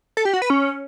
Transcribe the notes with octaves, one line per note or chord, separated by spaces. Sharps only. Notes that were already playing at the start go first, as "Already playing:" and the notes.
A4
G4
F#4
B4
C#4